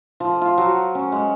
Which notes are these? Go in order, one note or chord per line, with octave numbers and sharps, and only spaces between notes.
F3
F4
F#3
C#4
G#3